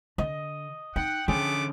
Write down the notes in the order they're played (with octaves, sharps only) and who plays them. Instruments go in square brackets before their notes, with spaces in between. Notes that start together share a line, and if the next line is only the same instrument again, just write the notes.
[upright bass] D3 [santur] D#5
[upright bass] D#4 [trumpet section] F#5 [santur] G5
[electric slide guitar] D3 C#4 [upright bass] F3 [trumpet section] A3 B3 D6 [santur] G#4